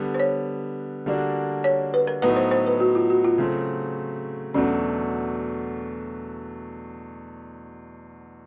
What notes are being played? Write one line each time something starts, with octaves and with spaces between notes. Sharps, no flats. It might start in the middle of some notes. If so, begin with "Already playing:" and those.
Already playing: D3 G3 B3
C5
C#5
D3 G3 A#3 D4 F#4
C#5
B4
A#4
A2 F#3 B3 D#4 B4
C5
C5
B4
F#4
F4
F#4
F4
C#3 F#3 A3 C4
E2 B2 F#3 A3 C#4 D4